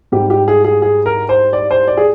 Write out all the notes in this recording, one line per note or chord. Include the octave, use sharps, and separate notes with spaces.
G#2 G3 G4
G4
G#4
G#4
G#4
A#4
C5
D5
C5
D5
G#4